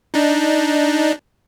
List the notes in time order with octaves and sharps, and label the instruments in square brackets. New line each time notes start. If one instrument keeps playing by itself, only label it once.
[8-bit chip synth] D4 D#4